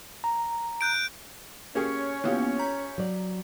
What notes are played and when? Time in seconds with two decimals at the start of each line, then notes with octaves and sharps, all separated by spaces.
0.24 A#5
0.81 F#6 G6 D7
1.75 A#3 C#4 G4 G#4 C#5
2.24 E3 A#3 B3 F4 G4
2.59 A#5 G6 B6
2.98 F#3 D5